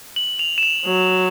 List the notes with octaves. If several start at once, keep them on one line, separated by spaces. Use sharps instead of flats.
F#7
F7
E7
F7
F#3